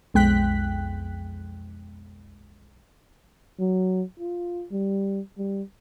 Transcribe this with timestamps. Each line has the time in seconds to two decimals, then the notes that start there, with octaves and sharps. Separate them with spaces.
0.14 B1 F2 G#3 G5 F#6 B6
3.60 F#3
4.19 F4
4.71 G3
5.38 G3